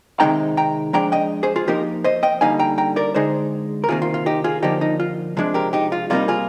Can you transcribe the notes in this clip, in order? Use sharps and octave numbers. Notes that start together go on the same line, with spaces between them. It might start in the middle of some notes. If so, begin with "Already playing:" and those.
C3 D#3 G#3 D#4 G5 A#5
G5 A#5
F3 G#3 D4 G5 A#5
D#5 G5
G#4 C5
F4 G#4
F3 A#3 D#4 G4 A#4
C5 D#5
D#5 G5
D3 G3 A#3 D#4 F5 G#5
G5 A#5
G5 A#5
A#4 D5
D3 G#3 D#4 G#4 C5
A#4
C3 D#3 A#3 F4 G#4
F4
F4
D#4 G4
F4 G#4
D3 F3 A#3 D#4 G4
D#4
F4
C3 F3 G#3 D4
G4 A#4
D#4 G4
F4
C3 G3 A#3 D#4 F4
F4 G#4